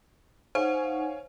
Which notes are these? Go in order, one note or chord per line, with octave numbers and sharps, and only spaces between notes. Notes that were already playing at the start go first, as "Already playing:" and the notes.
D#4 C5 C#5 F5 F#5 G#5